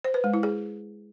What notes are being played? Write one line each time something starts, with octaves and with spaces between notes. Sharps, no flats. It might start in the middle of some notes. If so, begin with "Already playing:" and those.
C5
B4
G#3
E4
G#4